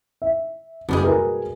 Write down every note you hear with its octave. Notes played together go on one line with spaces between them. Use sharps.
E5
F#1 B2 G3 G#3
G#4 A#4 B4